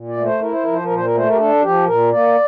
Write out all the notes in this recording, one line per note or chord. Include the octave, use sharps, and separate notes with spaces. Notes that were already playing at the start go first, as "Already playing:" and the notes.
Already playing: A#2
D5
A3
C5
E4 A#4
C5
F3 A#4
C5
A#4
A#2 C5
A#4
A3 C5
A#4
G4
D4 A4
F3 G4
A#2 A#4
A#3 D5